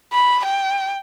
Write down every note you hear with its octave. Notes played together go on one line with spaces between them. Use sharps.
B5
G5